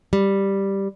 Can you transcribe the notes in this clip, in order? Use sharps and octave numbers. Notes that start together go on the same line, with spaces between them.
G3